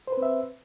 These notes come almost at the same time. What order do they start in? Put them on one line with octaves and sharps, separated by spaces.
C5 B4 C4 E5